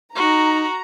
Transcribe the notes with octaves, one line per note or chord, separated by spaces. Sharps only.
D#4 F#4 A#5